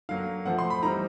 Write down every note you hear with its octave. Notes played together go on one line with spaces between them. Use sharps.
D3 F#3 A#3 F5
F3 A3 C4 F#5
C6
B5
E3 G3 C4 D#4 A#5